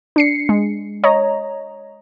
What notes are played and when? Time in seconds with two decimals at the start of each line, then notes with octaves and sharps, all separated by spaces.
0.16 D4 C7 C#7
0.49 G#3
1.04 C#5 D#5 A#5